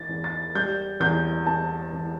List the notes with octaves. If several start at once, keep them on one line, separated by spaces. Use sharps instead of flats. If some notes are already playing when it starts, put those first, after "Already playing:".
Already playing: E3 A6
E2
A6
G3 G6
E2 G6
E2 A5
E2